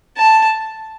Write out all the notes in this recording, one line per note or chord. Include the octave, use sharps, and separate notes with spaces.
A5